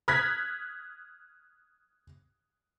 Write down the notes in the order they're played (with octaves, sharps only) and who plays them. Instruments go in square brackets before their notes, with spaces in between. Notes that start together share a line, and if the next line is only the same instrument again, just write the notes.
[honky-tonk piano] D#6 F6 F#6 G#6 A#6 B6